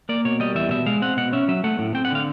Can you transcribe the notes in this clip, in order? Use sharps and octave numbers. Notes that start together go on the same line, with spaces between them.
A#3 D5
B2 C#5
G3 D#5
E2 E5
B2 E5
G#3 F5
C4 F#5
B2 F#5
C#4 E5
F#3 E5
A3 F#5
A2
C4 G5
F#5
D3 F5